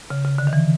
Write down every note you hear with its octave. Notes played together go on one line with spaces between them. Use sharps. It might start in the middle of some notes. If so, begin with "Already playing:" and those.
C#3
C#3
D3
D#3
E3